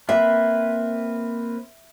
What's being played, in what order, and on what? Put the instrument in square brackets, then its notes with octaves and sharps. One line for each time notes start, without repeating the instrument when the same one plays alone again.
[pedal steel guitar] A#3 C4 B4 [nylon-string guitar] E5